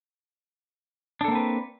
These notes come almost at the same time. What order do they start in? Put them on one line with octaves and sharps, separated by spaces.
D4 A4 A#3 C4 B4